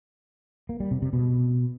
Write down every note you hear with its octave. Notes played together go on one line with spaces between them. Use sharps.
A#3
G3
C3
C3
B2